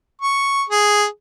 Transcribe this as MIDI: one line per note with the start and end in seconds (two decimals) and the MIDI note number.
0.22 0.63 85
0.70 1.05 68